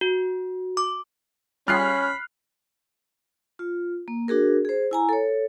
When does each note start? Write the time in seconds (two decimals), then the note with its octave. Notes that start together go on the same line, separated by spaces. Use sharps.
0.01 F#4
0.77 D6
1.68 G3 C#4 F4 G#4 B5 F6 F#6 C7
3.59 F4
4.08 A#3
4.28 D4 F#4 G#4 A#4
4.65 G#4 C5
4.91 E4 G#5 A#5
5.09 A4 C#5